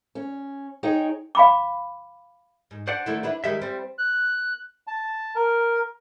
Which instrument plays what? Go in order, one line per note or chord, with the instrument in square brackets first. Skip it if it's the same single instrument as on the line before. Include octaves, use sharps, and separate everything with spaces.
[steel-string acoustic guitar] C#4
D#4 G#4 C#5 G5
[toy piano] F5 B5 D6
[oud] G#2
[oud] D4 [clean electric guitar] C5 D5 F#5
[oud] D#3 A3 E4
D4 E4 B4
[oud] D#3 G3 G#3 [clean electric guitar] E5
[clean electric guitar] G3 [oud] C4
[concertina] F#6
A5
A#4